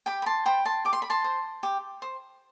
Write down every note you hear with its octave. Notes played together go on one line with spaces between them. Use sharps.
G4 G5 B5
B5
A5 C6
C5 G5 B5
A5 C6
G4 D6
C6
B5
A5 C6
C5
G4
C5